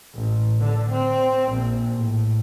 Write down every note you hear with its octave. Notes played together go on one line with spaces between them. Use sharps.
A1
D3
C4
A#1
A2